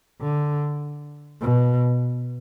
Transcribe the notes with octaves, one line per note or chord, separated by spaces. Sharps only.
D3
B2